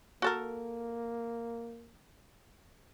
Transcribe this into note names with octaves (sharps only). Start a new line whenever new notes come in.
A#3 F#4 A4 A#4